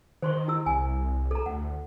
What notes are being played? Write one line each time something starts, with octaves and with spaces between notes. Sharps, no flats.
D#3 C5 C6 C#6
E4 E6
C2 G#5
A4 A#5
D2 F#5